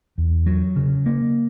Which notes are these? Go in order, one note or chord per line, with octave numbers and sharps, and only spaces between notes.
E2
F#3
C#3
A#3